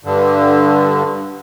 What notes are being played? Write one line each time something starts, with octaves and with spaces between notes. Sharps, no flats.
G2 D3